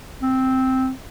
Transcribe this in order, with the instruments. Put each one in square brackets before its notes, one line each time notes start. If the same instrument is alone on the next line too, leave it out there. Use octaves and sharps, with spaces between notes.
[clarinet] C4